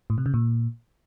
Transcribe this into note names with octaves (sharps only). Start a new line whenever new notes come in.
A2
C3
C#3
A#2